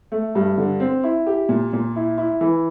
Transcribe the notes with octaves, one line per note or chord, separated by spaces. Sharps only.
A3
G2
D3
C4
E4
G4
A#2
A#2
E4
E4
E3